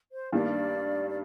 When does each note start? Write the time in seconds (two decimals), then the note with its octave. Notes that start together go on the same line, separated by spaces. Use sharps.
0.12 C5
0.32 G2 D#3 G3 A#3 D5
1.09 D5